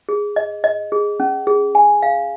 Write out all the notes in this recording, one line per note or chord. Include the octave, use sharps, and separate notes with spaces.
G#4
D#5
D#5
G#4
C#4
G#4
G#5
F5